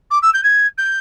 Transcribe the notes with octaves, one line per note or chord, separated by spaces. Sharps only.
D6
E6
G6
G#6
G6